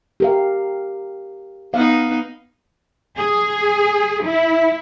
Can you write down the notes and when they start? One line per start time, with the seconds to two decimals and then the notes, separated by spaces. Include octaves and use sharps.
0.20 G4 A#4 F5
1.74 B3 D#4 F5
3.17 G#4
4.24 E4